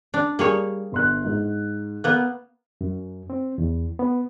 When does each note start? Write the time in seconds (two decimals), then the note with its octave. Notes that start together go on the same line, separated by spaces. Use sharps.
0.14 D4
0.39 G3 A#3 G#4 C#5
0.92 G1 C6 F#6
1.25 G#2
2.04 A#3 B3 F5 F#5 F#6
2.81 F#2
3.30 C4
3.58 E2
3.99 B3